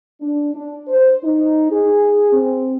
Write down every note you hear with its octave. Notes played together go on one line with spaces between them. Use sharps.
D4
D4
C5
D#4
G#4
C4